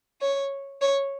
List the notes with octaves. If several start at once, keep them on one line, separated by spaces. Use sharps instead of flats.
C#5
C#5